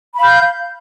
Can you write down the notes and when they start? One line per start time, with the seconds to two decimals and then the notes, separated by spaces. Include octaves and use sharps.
0.15 B5
0.19 F5
0.24 G6